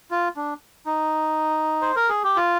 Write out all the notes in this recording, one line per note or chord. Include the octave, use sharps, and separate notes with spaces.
F4
D4
D#4
C5
A#4
G#4
G4
F4